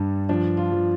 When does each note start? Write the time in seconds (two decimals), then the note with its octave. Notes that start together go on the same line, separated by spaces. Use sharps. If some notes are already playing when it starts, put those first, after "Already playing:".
Already playing: G2 G3 D4
0.29 F3 D4
0.57 F4
0.72 F3